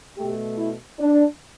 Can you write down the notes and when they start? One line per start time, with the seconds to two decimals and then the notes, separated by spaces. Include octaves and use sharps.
0.17 B2 A3 G4
0.58 E4
0.99 D4